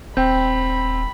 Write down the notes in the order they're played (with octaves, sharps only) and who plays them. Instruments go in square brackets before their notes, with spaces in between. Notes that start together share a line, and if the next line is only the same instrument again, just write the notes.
[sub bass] D#1 [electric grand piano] C4 [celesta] G5 G6 [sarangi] B5